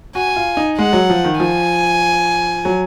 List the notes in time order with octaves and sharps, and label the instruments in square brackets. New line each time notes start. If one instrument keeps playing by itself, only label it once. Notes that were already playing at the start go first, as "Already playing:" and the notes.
[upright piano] F#4 [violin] G#5
[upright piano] F4
D#4
[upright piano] G#3 [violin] F#5
[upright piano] F#3
F3
D#3
[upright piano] F3 [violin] G#5
[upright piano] F#3